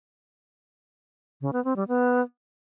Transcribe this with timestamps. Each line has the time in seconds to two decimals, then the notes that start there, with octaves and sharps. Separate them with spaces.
1.41 C#3
1.53 B3
1.65 C4
1.76 G3
1.88 B3